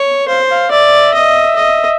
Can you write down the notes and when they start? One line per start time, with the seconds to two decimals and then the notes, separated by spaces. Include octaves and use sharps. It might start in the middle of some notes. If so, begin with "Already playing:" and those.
Already playing: C#5
0.28 C5 F5
0.51 F5
0.71 D5 E5
1.14 D#5
1.56 D#5